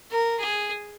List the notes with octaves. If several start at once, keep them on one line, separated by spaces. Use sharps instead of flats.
A#4
G#4